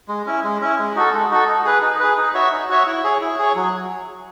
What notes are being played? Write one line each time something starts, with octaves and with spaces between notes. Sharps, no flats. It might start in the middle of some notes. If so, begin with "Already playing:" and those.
G#3
C#4 E4
G#3
C#4 E4
G#3
D#4 F#4 A4
G#3
D#4 F#4 A4
D#4
G#4 B4
D#4
G#4 B4
D#4
F#4 C#5 E5
D#4
F#4 C#5 E5
E4
G#4 C#5
E4
G#4 C#5
F#3